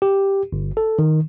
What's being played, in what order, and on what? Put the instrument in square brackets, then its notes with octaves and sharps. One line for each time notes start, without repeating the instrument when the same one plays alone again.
[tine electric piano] G4
G1
A4
D#3